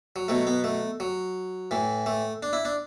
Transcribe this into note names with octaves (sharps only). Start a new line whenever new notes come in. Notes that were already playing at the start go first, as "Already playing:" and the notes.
F#3
B2 F#3 A3
B3
A3
F#3
A2 E3
A3
D4
E4
D4